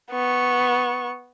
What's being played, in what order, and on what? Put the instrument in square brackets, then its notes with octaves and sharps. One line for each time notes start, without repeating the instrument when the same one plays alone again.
[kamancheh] B3 C#6